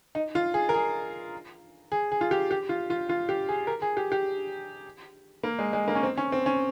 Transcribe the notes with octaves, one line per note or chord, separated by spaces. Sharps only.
D#4
F4
G#4
A#4
G#4
G#4
G#4
F4
G4
G4
F4
F4
F4
G4
G#4
A#4
G#4
G4
G4
A#3
G#3
G#3
A#3
C#4
C4
C#4
C4
C#4